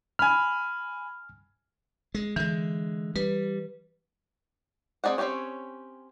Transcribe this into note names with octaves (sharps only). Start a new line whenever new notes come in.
G#5 B5 F6
G#3
D3 E3 G#3
G3 B4
C4 E4 G#4 D5 F#5
C4 C#4 F4 G4 C#5